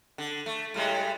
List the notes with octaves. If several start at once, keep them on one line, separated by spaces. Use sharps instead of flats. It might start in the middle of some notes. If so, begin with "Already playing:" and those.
D3
A3
A2 G3 G#3